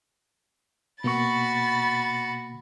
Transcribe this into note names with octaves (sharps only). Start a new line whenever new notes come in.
B2 A#3 F#4 B5 C#6 A6